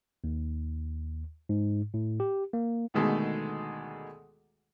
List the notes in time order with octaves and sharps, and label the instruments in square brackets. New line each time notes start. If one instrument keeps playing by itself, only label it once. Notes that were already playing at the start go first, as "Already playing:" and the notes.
[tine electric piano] D#2
G#2
A2
G4
A#3
[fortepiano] D2 B2 D#3 G#3 A3 A4